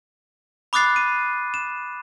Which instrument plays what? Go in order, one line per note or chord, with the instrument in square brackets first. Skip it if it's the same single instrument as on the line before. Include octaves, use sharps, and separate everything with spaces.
[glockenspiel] B5 D6 D#6 F#6 A6 C7
D#7
E7